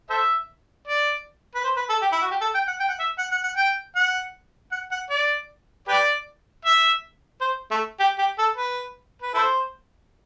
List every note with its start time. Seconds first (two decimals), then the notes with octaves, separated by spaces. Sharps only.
0.10 A4 C5 E5
0.88 D5
1.55 B4
1.64 C5
1.76 B4
1.90 A4
2.02 G4
2.12 E4
2.22 F#4
2.31 G4
2.41 A4
2.54 G5
2.68 F#5
2.80 G5
2.89 F#5
3.00 E5
3.19 F#5
3.32 F#5
3.44 F#5
3.57 G5
3.96 F#5
4.72 F#5
4.92 F#5
5.10 D5
5.88 G4 B4 D5
6.65 E5
7.41 C5
7.71 A3
8.00 G4
8.19 G4
8.38 A4
8.57 B4
9.22 B4
9.34 E4 A4 C5